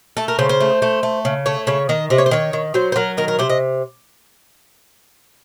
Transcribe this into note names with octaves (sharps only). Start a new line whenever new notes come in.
A3 A4
A#4
C#3 C5
C5
A3
A3
A3
C#3
A3 C#5
C#3 C#5
D#3 D#5
C3 D#5
C#5
C5
D#3 C#5
D#3
F#3 C5
C5
F#3 A#4
D#3 A#4
A#4
C3 C5
D#5